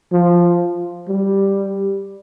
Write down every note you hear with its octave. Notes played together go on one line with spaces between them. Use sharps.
F3
G3